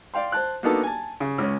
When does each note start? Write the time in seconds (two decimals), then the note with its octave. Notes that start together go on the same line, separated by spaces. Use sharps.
0.14 D5 F5 G5 C6
0.32 C5 A5 F#6
0.63 A#3 B3 D4 D#4 F#4 A4
0.84 G#5 A5
1.20 C#3
1.38 C#2 C#4